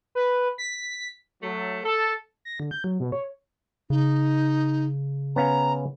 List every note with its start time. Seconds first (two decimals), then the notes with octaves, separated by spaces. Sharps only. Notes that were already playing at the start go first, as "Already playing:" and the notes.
0.15 B4
0.58 B6
1.43 F#3 A3
1.84 A4
2.45 A#6
2.60 D3
2.71 G6
2.84 F#3
3.00 B2
3.12 C#5
3.90 C#3 D#4
5.36 B3 C#4 F5 A#5